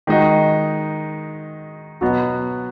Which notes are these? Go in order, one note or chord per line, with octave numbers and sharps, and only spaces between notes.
D#3 G#3 D#4 F#4
B2 F#3 B3 F#4